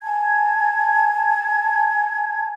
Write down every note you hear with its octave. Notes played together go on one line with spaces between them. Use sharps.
G#5 A5 G#6